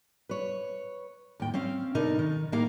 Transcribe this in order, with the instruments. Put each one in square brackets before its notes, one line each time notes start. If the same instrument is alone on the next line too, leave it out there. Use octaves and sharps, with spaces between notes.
[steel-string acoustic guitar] B4 C#5
D#2 A2 G5
C4 C#4 F5
B2 D3 D#4 A#4 D#5
D#3
A2 A#3 D#4 G4 A#4 F5